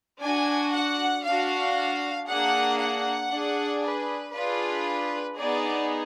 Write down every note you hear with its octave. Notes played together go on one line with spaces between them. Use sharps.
D4 F#4 G#5
F#5
D4 F#4 F5
A#3 D4 G#4 F#5
F#5
D4 G#4
B4
D4 F4 G#4 B4
B3 D#4 G#4 D5